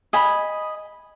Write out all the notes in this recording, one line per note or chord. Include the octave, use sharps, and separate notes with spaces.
D#5 G#5 B5